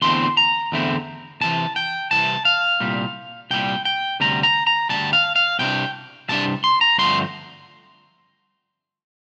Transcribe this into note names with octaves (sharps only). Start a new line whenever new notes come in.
E2 D3 A3 C4 E4 C6
A#5
E2 D3 A3 C4 E4
C2 C3 E3 A5
G5
C2 C3 E3 A5
F5
C2 A#2 G3
C2 A#2 G3 G5
G5
D2 C3 G3 A#5
A#5
A#5
D2 C3 G3 A5
F5
F5
C2 C3 G3 D4 G5
C2 C3 G3 D4 A5
C6
A#5
G2 D3 F3 A3 C4 C6